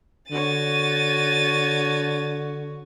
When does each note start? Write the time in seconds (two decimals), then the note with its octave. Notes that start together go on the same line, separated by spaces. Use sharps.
0.32 D3 F#4 C#5 A6 D#7